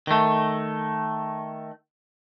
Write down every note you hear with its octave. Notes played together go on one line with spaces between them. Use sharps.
D#3 A3